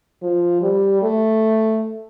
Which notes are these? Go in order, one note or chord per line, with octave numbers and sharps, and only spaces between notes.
F3
G3
A3